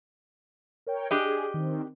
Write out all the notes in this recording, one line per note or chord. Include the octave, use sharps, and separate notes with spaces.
A#4 C#5 G5
D4 G4 G#4 D#5
D#3 C4